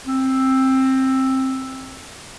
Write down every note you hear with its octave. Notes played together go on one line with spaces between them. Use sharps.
C4